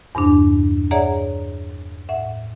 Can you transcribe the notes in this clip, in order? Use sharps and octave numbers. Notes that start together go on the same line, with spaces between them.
E2 G2 C3 D4
G#4 C#5 D5 E5 F#5 A#5
A2 E5 F#5